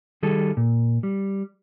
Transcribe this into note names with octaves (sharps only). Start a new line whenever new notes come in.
D#3 G3 G#4 A4
A#2
G3